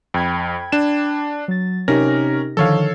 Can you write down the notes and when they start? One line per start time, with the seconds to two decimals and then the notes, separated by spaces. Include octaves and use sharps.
0.14 F2 G5 B5 G#6
0.72 D4 E7
1.48 F#3 A6
1.88 C3 C#4 D#4 G4 A#4 A#6
2.57 D3 D#3 F3 A4 C#5 F5